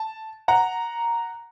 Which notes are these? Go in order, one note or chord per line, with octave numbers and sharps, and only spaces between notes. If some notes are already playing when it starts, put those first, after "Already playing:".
Already playing: A5
F#5 A#5